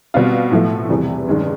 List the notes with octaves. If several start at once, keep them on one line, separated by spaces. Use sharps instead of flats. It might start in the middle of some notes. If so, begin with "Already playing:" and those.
B2 G3 C4 F4
A2 F3 A3
E2 C3 E3 G3 C4
G2 D#3 G#3 C#4